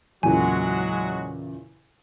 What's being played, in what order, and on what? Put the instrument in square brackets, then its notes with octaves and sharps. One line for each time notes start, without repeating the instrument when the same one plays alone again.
[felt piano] E2 A#2 C#3 [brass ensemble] F#3 G#3 F#4 [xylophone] G#5